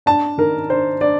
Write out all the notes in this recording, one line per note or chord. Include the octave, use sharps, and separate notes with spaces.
D4 A5
D#3 A#4
D4 C5
D4 D5